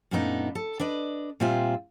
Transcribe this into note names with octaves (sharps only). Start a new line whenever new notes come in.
F#2 A#2 A3 B3 D4 D#4
A4
D4 B4 D5 D#5
A#2 G3 C4 F4 E5 G#5